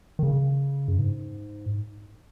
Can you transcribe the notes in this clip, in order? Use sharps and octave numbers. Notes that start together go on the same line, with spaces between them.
D#3
C#3
F#2
G#2